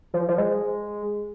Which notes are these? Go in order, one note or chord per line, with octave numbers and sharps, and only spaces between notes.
F3
F3
G#3